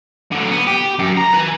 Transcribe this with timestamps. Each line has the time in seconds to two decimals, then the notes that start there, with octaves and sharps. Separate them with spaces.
0.32 D3 F#3
0.51 B3
0.67 G4
0.99 F#2
1.17 A#5
1.33 B4 G#5